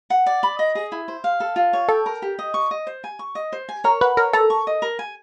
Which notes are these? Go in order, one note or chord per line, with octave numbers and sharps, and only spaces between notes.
F#5
D5
B5
D#5
G#4
E4
C5
F5
A4
F4
C#5
A4 G5
A#4
G4
D#5
C#6
D#5
C5
G#5
C#6
D#5
C5
G#5
A#4 C#5
B4 F#5
A#4 C#5
A4 A#5
C#6
D#5
A#4
G#5